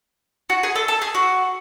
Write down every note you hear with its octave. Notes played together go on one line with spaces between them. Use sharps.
F#4
G#4
A4
A4
G#4
F#4